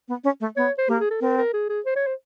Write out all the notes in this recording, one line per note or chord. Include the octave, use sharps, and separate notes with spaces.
B3
C#4
A3
B3 C#5
C5
A#3 G4
G#4
A4
C4 A#4
A#4
G#4
G#4
C5
C#5
C5